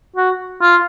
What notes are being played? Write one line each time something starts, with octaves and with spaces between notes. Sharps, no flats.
F#4
F4